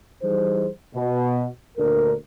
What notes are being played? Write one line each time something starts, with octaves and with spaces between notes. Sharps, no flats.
E3 G3 D#4 G#4 C5
B2
D2 A#2 D4 A4 A#4